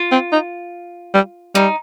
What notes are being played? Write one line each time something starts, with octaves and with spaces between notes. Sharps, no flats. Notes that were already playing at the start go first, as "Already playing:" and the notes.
Already playing: F4
C4
D#4
G3
G3 D#4